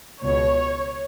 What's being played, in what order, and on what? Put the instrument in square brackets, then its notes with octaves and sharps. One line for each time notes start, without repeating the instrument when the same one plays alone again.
[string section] C#2 B2 C#5